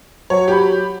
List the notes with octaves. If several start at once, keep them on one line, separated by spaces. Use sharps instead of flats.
F#3 C#5
G4 B5